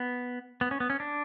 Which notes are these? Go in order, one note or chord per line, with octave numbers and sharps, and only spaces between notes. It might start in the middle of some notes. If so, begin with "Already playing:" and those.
Already playing: B3
B3
C#4
B3
C#4
D4